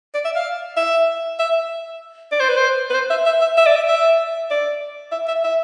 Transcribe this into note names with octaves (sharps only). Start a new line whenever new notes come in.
D5
E5
F5
E5
E5
D5
C5
B4
C5
B4
C5
E5
E5
E5
E5
D5
E5
E5
D5
E5
E5
E5